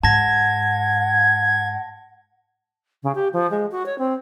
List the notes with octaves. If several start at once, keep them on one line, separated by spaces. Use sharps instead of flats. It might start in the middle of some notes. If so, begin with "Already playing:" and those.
G#2 F#5 A5 G#6 A#6
C#3
G4
F3
G#3
F#4
C#5
C4